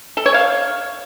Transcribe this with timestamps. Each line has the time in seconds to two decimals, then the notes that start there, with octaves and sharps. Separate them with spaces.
0.17 A4
0.26 C#5
0.34 F5